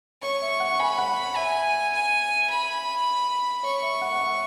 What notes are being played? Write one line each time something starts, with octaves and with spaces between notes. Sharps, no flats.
C#5 C#6
E5
F#5
G#5 B5
F#5
E5 G#5
G#5
B5
C#5 C#6
E5
F#5
F#5
E5